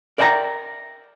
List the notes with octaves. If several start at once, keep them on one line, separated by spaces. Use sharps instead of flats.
A#4 D5 E5 G5 G#5 A#5